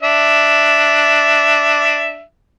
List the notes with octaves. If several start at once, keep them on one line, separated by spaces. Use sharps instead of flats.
D4 E5